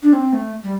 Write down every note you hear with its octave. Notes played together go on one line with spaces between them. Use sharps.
D4
C4
A3
G3